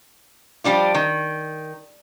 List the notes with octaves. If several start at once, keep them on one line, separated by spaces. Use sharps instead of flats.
F3 G3 D4 F4
D#3